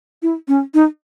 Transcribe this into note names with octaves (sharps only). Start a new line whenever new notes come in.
E4
C#4
D#4